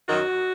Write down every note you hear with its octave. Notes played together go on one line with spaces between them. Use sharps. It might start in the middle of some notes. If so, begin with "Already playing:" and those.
F#2 D#3 F#3 F#4